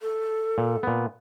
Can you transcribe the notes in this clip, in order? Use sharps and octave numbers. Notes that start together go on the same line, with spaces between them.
A4
A#2
A#2 B3